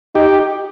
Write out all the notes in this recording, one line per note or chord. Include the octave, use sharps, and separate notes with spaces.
D#4 G4